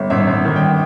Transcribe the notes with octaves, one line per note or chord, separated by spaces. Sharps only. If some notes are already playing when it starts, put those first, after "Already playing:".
Already playing: G1
G#1 E5
G#1
D#3
G5